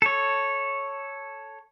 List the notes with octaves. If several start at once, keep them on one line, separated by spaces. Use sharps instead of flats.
A4 C#5